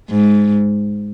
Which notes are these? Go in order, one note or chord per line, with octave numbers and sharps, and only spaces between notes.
G#2